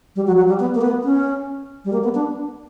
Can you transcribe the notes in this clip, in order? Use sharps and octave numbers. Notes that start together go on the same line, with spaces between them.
G3
F#3
F#3
G3
B3
A#3
B3
C#4
G3
A#3
B3
D4